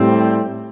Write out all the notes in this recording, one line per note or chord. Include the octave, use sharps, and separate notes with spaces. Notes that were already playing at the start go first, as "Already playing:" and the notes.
Already playing: A2 G3 C4